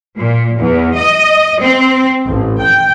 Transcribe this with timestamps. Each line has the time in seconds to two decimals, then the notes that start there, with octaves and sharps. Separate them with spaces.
0.18 A#2
0.59 E2
0.96 D#5
1.62 C4
2.27 A1
2.62 G5